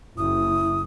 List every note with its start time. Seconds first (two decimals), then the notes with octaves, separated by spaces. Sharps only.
0.18 F#1 E4 D#6